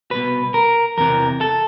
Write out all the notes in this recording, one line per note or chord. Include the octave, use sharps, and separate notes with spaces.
C2 B2 B4
A#4
E2 C3 E3 A#4
A4